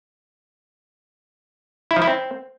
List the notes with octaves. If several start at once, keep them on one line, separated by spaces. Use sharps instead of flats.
E4
F3
E4
C4